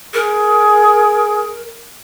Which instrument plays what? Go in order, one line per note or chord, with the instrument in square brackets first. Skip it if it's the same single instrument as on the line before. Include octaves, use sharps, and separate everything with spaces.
[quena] G#4 [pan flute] A#4